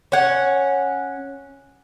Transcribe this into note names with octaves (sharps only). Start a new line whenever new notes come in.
C#4 F#5